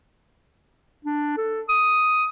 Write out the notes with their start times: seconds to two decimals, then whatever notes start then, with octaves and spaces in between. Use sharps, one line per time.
1.05 D4
1.37 A4
1.69 D#6